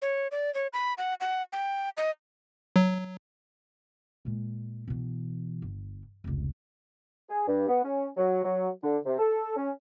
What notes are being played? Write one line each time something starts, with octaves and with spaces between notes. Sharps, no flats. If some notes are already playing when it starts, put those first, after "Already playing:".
C#5
D5
C#5
B5
F#5
F#5
G5
D#5
F#3
A#2 G#3
B2 E3
G1
F1 C#2
G#4
G2
B3
C#4
F#3
F#3
D3
C3
A4
C#4